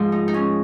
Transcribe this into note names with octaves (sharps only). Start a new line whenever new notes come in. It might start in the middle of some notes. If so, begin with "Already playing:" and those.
Already playing: G#2 F3 F4
D#4
D#4
C#4